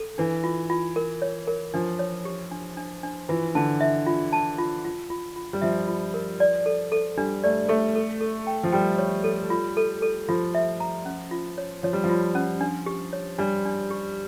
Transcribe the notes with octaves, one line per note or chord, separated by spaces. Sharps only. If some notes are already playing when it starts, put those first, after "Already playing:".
Already playing: A4
E3 D4
F4
F4
A#4
C#5
A#4
F3 D4
C#5
G4
D4
D4
D4
E3 F4
D3 A5
E5
F4
A5
F4
F4
F4
F4
G3
F3 E5
F4
A#4
D5
A4
A4
G3 D4
A3 D5
A3 A4
A4
A4
G5
F3
G3 G5
C#5
A4
F4
A4
A4
F3 F4
E5
A#5
C#4
F4
C#5
F3 C#5
G3
F3
F4
C#4
D4
G4
C#5
G3 D4
D4
G4